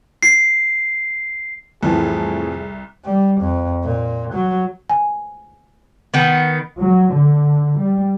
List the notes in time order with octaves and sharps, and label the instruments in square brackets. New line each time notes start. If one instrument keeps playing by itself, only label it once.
[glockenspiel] C7
[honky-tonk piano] C2 [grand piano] F2 [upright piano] A2 E3 A4 [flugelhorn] G#4
[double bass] G3
F2
A#2
F#3
[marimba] G#5
[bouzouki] D#3 B3
[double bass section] F#3
D3
G3